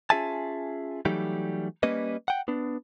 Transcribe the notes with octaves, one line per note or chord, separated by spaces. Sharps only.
C#4 F4 G#4 E5 G#5 A5
E3 F#3 G3 A3 D#4 G4
G3 A#3 C#4 B4 D#5
F#5 G5
B3 D4